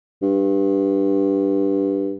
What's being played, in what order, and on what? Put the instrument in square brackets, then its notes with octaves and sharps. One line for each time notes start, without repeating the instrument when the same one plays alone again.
[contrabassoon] G2